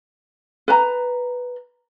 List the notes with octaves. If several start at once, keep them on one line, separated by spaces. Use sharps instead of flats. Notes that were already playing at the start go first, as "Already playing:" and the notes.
B4 A#5